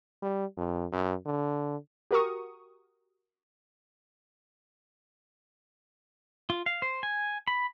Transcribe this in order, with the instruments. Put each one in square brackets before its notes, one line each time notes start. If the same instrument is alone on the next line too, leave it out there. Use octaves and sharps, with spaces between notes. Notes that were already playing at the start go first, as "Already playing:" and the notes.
[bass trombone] G3
F2
F#2
D3
[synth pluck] F#4 G4 A#4 A#5 C#6 D#6
[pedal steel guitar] F4
F5
C5
G#5
B5